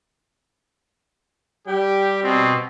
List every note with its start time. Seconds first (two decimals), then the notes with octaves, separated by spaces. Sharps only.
1.67 G3 G4
2.23 B2 C4